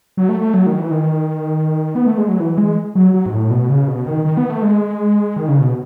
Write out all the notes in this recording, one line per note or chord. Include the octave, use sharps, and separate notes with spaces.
F#3
A3
A3
F#3
D#3
E3
D#3
B3
A3
G#3
F#3
E3
G#3
F#3
F#3
G#2
A2
B2
C#3
B2
D#3
D#3
B3
A3
G#3
D#3
C#3
B2